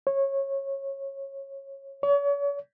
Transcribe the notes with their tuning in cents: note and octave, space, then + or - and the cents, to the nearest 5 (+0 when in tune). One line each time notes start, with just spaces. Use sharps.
C#5 -20
C#5 +40